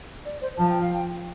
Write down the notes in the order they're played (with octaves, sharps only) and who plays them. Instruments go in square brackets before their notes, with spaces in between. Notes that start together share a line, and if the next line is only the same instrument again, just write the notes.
[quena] D5
C5
[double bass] F3 [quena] A5
[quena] G5
F5
G5